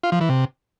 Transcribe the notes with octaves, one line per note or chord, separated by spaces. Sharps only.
F4
F3
E3
C3